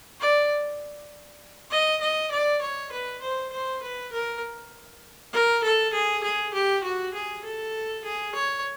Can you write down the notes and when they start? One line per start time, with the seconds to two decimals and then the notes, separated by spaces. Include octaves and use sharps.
0.21 D5
1.71 D#5
2.01 D#5
2.31 D5
2.62 C#5
2.92 B4
3.22 C5
3.52 C5
3.82 B4
4.12 A#4
5.33 A#4
5.64 A4
5.93 G#4
6.23 G#4
6.54 G4
6.84 F#4
7.14 G#4
7.44 A4
8.05 G#4
8.35 C#5